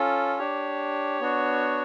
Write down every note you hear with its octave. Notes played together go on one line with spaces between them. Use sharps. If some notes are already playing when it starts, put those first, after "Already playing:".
Already playing: C#4 F4 A4
D4 G4 C#5
B3 D4 F#4